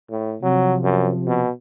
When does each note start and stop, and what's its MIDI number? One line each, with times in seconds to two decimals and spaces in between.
0.11 0.36 45
0.43 1.46 48
0.43 1.46 53
0.43 0.75 54
0.84 1.10 42
1.27 1.50 47